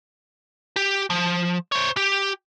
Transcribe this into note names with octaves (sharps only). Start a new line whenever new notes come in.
G4
F3
C5 C#5
G4